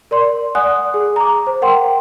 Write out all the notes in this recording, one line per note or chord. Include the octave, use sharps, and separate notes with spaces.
A#4 D5 C6
D5 F#5 G#5 D#6 F#6
G#4
A#5 D6
C5
A#4 F#5 G5 C6